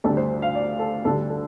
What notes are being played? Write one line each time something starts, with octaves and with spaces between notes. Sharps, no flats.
D2 D3 G3 A4
C5
F5
D5
A4
D2 D3 G3 A4
A4